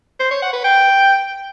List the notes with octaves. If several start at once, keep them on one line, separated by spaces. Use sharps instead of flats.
C5
C#5
F#5
B4
G5